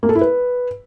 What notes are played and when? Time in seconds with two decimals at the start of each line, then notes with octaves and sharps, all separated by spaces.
0.03 A#3
0.09 A4
0.15 E4
0.21 B4